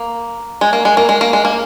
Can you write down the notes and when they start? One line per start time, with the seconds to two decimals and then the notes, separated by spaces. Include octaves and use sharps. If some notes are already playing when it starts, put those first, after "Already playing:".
Already playing: A#3
0.61 G#3
0.73 A#3
0.85 G#3
0.97 A#3
1.09 G#3
1.21 A#3
1.33 G#3
1.45 A#3